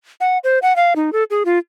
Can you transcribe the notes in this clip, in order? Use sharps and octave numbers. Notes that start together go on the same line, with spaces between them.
F#5
C5
F#5
F5
D#4
A4
G#4
F4